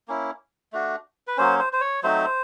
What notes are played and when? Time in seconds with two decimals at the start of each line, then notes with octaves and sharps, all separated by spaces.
0.08 A#3 C#4 E4
0.73 A3 D4 F#4
1.27 B4
1.37 F#3 A#3 C#4 C5
1.59 C5
1.73 C5
1.81 C#5
2.03 F#3 A3 C4 D#4 C5